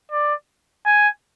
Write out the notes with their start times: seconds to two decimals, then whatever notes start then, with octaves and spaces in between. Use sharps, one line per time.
0.11 D5
0.86 G#5